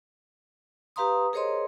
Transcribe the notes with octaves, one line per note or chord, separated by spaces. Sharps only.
G4 B4 F5 A#5 C6 D#6
G#4 A#4 C5 C#5 D#5 C6